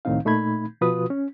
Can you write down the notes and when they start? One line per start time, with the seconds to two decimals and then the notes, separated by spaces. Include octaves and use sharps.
0.05 C2 A2 D#3 C4 D#4 F5
0.25 A#2 A3 D#4 B5 G#6
0.81 B2 F3 F4 F#4 B4 D#6
1.10 C#4